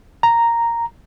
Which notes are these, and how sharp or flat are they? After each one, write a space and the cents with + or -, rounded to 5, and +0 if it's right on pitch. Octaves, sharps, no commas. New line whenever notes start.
A#5 -5